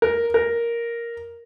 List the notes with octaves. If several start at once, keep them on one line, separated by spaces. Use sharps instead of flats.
A#4
A#4